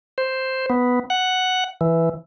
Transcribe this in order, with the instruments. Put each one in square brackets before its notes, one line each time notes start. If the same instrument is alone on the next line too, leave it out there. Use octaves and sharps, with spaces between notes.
[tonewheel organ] C5
B3
F#5
E3